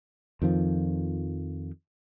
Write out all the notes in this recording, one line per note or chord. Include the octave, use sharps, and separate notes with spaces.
F2 D#3 F3